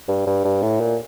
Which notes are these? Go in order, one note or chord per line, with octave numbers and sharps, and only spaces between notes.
G2
G2
G2
A2
A#2